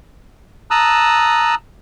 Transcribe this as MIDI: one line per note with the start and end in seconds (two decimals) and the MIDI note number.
0.71 1.55 81
0.71 1.55 82
0.71 1.55 87
0.71 1.55 88
0.71 1.55 90